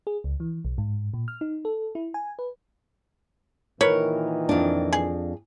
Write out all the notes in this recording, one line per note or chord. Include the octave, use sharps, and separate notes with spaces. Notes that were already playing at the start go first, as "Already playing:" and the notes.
G#4
C#2
E3
B1
G#2
A#2
F6
D#4
A4
E4
G#5
B4
A#2 D#3 E3 A#4 B4 C#5
F2 D4
G#4